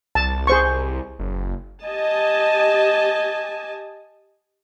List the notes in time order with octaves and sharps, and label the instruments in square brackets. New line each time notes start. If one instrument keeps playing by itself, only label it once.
[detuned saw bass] C2 [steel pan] A5
[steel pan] G#4 C5 C#6
[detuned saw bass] F#1
[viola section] G4 D#5 G#5 A5